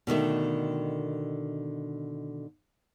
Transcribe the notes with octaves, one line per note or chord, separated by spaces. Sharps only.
B2 D3 D#3 A3